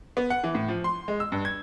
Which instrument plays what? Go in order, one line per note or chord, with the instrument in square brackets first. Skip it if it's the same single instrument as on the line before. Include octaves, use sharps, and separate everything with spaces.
[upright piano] B3
F#5
E3
A2
F3
C6
G#3
E6
G2
G#6